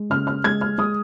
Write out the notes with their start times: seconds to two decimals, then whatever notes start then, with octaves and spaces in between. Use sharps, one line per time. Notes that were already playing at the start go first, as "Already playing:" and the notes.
Already playing: G#3
0.10 C#3 F6
0.27 F6
0.44 G#3 G#6
0.61 F6
0.78 G#3 D#6